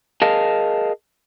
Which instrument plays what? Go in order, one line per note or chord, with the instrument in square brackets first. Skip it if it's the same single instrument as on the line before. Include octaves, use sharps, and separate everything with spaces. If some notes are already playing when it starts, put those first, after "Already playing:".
[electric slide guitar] G#4 A#4 D#5 F5 A5